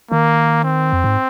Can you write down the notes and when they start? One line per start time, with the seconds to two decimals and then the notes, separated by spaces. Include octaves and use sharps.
0.12 D#3 A#3
0.64 C4
0.92 F2
1.04 G#2